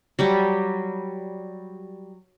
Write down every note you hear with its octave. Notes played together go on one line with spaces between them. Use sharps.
F#3 G3 G4